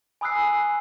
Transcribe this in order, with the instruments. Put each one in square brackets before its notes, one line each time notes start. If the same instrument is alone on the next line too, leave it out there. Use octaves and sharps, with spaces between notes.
[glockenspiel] G#5 B5 D#6 E6 F#6 C7